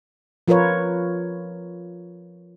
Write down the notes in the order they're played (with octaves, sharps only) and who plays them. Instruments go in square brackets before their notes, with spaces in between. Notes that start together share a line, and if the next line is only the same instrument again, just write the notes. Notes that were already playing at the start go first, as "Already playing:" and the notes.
[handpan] F3 F4 A#4 B4 C#5